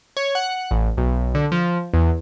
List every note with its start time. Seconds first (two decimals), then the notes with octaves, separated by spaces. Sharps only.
0.17 C#5
0.35 F#5
0.71 A1
0.97 B1
1.35 D3
1.52 F3
1.94 E2